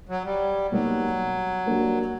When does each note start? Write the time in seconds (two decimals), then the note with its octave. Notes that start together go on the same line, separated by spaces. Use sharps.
0.09 F#3
0.24 G3
0.72 B2 F#3 G3 A#3 D#4
1.66 G3 A#3 D4 F#4